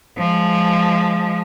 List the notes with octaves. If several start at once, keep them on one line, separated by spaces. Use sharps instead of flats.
F3 G#3